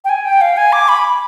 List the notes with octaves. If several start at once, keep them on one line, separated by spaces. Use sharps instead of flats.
G5
G#5
G5
F5
G#5
D6
B5